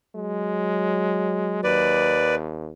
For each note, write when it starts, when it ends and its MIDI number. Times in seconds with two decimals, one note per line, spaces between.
0.15 2.20 54
0.15 1.62 56
1.64 2.71 39
1.64 2.35 71
1.64 2.35 74